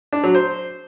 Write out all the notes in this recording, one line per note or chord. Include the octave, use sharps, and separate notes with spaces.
D4
F#3
C5